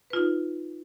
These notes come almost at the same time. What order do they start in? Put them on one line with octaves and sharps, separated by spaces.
B4 F4 D#4